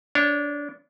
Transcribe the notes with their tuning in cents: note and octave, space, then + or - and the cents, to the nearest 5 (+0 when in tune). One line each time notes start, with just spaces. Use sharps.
D4 -20 C#5 +0